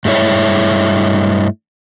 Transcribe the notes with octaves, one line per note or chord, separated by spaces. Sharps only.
G2 G#3 A3 E4 C#5